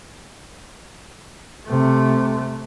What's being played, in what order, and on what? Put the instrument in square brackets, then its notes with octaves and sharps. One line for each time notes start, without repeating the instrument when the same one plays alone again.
[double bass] C3 A3